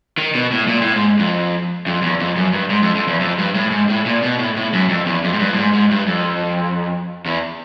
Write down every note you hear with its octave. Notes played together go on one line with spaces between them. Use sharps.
D#3
B2
A2
A#2
A2
G#2
F2
F2
E2
F2
F#2
G2
G#2
F2
F2
E2
F2
G2
A2
G#2
A2
A#2
B2
A2
A2
F#2
F2
E2
F2
G#2
G2
A2
G#2
G#2
G2
F2
E2